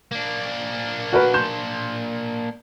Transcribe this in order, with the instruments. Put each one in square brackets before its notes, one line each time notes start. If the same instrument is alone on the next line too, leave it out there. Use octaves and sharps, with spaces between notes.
[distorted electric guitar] A#3 D4
[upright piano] F#4 A#4 B4
C6 G6 E7